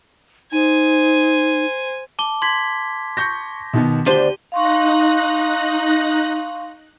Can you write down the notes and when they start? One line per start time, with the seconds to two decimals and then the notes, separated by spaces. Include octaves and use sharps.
0.52 D#4 C5 G#5
2.19 A5 D6 G7
2.42 C6 G#6 B6
3.17 C#6 G6 A#6
3.73 B2 D#3 B3
4.06 D2 D4 G4 C5 D#7 G7
4.52 D#4 F5 C6 C#6 F#6 A#6